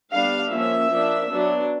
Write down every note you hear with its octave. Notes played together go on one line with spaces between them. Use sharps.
G3 B3 D4 F5
F3 A#3 C#4 E5
F3 A#3 D4
F#3 B3 D4